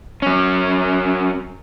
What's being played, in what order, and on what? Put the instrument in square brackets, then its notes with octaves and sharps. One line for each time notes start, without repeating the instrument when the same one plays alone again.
[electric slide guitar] F#3 C#4